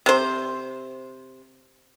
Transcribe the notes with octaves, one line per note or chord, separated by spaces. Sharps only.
C3 C5